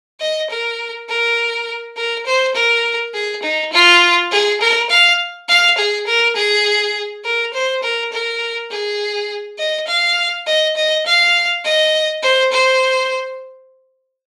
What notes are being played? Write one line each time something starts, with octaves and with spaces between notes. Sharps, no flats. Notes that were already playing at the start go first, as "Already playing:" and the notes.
D#5
A#4
A#4
A#4
C5
A#4
G#4
D#4
F4
G#4
A#4
F5
F5
G#4
A#4
G#4
A#4
C5
A#4
A#4
G#4
D#5
F5
D#5
D#5
F5
D#5
C5
C5